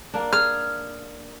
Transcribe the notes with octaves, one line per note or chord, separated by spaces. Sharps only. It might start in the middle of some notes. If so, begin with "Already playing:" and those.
A#3 D4
G#4 F6